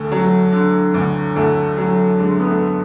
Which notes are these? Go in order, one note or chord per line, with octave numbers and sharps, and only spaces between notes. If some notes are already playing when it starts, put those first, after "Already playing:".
Already playing: D2 A3
F#3
D3
D2
D2 A3
F#3
D3 G#3
B3
A3